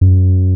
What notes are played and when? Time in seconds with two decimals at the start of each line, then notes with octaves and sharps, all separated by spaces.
0.01 F#2